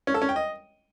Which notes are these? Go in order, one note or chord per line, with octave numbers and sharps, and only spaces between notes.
C#4
A4
C#4
G5
D#5